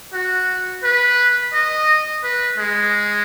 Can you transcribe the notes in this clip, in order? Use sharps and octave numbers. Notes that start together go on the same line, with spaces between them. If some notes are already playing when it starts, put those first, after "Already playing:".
F#4
B4
D#5
B4
G#3